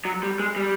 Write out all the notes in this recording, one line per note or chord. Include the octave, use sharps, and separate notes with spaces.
F#3
G3
G#3
G3